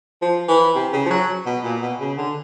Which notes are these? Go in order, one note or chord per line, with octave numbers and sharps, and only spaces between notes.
F3
E3
C3
C#3
F3
F#3
B2
A#2
B2
C#3
D3